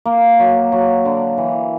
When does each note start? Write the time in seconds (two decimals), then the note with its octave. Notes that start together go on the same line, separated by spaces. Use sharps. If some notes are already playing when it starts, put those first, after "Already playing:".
0.06 A#3
0.39 F#3
0.72 F#3
1.05 D3
1.38 E3